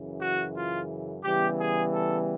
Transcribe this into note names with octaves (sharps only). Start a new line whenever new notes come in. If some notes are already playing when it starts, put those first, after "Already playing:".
Already playing: F#2 C#3 E3
F#4
F4
C#3 E3 G3 B3 G4
G#4
A4